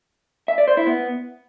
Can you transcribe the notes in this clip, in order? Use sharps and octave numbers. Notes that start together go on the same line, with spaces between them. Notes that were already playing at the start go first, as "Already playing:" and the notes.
E5
D5
C5
E4
B3